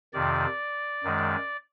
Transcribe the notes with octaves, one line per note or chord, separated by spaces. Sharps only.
F2 C3 D#3 D5
F#2 D#3 G#3